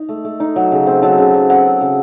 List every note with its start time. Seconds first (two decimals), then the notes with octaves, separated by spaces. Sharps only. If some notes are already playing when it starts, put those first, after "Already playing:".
Already playing: D#4
0.09 A3
0.24 A3
0.40 D#4
0.56 F#3
0.72 C#3
0.87 C4
1.02 F#3 A5
1.18 C#3
1.34 F#3
1.50 C4 F#5
1.65 C4
1.81 C#3